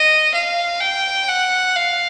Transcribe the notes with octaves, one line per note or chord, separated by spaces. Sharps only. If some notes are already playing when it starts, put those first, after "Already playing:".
Already playing: D#5
F5
G5
F#5
F5